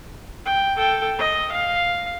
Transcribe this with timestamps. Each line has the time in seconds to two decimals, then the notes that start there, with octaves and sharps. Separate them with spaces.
0.46 G5
0.77 A4 G5
1.18 D#5
1.52 F5